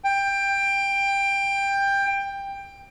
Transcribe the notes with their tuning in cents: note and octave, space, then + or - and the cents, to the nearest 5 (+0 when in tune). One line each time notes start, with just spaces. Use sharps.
G5 +15